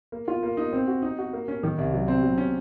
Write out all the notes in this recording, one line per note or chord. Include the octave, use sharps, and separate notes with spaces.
A#3
F4
A#3
D#4
C4
F#4
D#4
F#4
A#3
C#4
D#3
C2
F#3
C4
F#3
C#4